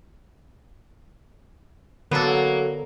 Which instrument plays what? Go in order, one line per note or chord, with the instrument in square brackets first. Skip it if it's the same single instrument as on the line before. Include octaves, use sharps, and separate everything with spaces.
[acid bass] D3 [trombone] F#3 [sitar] A#3 [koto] B3 A4